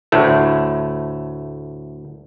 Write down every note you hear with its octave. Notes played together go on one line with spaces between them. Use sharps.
D2 A2 A3